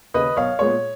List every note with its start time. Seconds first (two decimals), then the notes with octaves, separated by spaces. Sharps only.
0.14 D#2 C#3 B4 D#5
0.37 B1 C#5 F5
0.59 A#2 G#3 B3 C#5